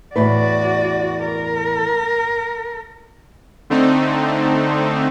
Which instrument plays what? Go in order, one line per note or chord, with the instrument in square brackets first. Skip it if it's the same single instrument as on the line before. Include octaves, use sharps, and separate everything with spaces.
[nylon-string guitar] E2 A2 B4 [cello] F#4 D5
[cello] A#4
[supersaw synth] D3 A3 C4 D#4